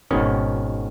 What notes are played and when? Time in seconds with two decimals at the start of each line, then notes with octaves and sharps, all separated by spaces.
0.11 G#1 B2 D#3 C#4